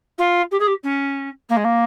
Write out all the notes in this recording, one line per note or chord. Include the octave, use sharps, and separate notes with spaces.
F4
G4
G#4
G4
C#4
A#3
G#3
A#3